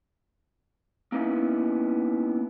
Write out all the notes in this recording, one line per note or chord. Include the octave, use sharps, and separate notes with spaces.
A#3 B3 C#4 D#4 E4